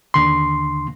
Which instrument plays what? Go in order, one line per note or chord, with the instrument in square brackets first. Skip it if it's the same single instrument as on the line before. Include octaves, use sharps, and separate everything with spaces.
[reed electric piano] D#2 D3 C6